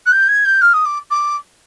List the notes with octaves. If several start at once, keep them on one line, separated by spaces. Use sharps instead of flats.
F#6
G6
G#6
G6
F6
D#6
D6
D6